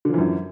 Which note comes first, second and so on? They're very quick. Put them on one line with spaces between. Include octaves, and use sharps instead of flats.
D3 F3 E3 F#2